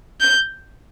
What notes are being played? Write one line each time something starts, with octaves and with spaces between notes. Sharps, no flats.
G6